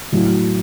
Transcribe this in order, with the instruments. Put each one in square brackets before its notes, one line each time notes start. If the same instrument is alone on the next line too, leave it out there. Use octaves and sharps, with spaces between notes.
[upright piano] A2 F#3